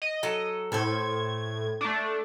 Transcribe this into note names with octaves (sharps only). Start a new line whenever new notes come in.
D#5
F#3 A4
A2 A4 C5 G#6
A3 D4